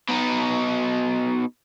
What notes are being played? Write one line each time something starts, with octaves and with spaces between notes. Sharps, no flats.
B2 D#4